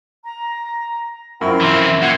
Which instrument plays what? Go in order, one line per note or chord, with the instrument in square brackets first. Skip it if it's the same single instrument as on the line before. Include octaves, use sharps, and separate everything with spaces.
[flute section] A#5
[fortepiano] F#2 [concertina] E4 A#4 [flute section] F4 C5 G5
[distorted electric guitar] E3 C4 [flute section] C6
[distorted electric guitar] A#3 F4 [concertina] F#5 G5 [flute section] G#6